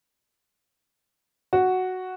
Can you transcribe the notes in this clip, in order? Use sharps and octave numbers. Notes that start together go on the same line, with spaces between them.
F#4